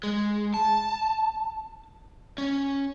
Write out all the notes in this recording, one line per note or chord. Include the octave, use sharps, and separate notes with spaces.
G#3
A5
C#4